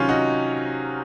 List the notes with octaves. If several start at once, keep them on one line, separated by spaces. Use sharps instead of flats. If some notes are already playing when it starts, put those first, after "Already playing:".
Already playing: C3 D#3 F#3 C#4 F4
D#4 F#4